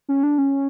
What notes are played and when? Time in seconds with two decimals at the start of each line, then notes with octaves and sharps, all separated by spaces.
0.09 C#4
0.23 D4
0.38 C#4